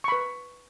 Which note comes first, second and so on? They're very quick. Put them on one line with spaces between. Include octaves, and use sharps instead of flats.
C#6 B5 B4